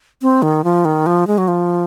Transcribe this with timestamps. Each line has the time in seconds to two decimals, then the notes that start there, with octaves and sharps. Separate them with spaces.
0.22 C4
0.42 D#3
0.64 F3
0.85 D#3
1.06 F3
1.27 G#3
1.38 F#3
1.48 F3